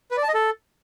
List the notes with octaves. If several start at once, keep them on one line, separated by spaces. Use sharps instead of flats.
B4
D5
A5
D#5
A4